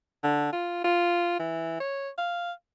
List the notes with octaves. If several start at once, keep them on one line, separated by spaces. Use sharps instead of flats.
D3
F4
F4
E3
C#5
F5